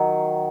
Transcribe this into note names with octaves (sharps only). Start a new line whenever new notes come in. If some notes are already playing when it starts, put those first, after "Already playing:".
Already playing: D#3 F#3